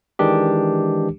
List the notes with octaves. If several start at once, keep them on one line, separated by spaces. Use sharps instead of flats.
D#3 E3 G#3 D4 G4